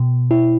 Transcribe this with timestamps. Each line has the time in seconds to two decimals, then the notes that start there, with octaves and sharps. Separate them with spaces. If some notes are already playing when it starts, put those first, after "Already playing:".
Already playing: B2
0.31 E4